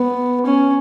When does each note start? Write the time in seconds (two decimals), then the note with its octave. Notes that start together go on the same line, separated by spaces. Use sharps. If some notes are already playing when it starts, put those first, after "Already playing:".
Already playing: B3
0.46 C#4